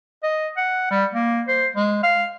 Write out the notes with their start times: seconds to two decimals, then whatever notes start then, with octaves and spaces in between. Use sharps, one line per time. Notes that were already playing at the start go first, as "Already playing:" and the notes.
0.23 D#5
0.57 F#5
0.91 G3
1.14 A#3
1.48 C5
1.76 G#3
2.03 F5